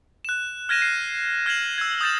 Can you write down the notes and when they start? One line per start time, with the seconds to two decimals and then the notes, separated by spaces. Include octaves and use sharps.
0.25 F#6 E7
0.69 F6 G#6 A#6 D#7 E7
0.81 F6 C7 D#7
1.46 F6 G#6 C7 E7 F#7
1.78 E6 G#6
2.01 D#6 G6 A6 E7